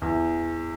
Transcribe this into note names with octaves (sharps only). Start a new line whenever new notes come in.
E2